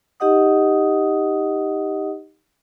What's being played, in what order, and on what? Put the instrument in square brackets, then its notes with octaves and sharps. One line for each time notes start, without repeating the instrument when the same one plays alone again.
[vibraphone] D#4 G4 D#5 F#5 D#6